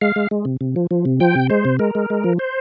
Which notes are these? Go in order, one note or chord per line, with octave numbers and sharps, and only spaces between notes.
G#3 F5
G#3
G#3
C3
C3
F3
F3
C3
F3 G5
C3
G#3 C5
C3
G#3 A#4
G#3
G#3
F3
C5